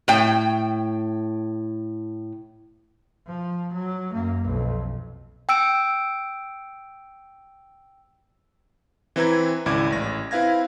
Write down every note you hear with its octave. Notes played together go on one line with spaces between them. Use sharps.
A2 G5
F3
F#3
F#2 A#3
B1 F2
G5 E6 D7
E3 C4 E4 B4 A#5 G#6
G#1 C#2 E4 D5 D6 G#6
A1 A#6
C4 E4 B4 F5 G#6 A#6